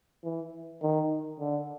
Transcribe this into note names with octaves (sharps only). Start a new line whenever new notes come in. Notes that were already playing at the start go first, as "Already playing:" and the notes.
E3
D#3
D3